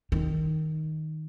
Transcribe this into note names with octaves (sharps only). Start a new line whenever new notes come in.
D#3